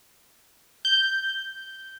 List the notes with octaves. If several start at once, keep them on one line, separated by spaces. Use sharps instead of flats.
G6